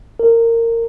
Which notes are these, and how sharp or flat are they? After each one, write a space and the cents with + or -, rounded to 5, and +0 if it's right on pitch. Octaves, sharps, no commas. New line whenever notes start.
A#4 -20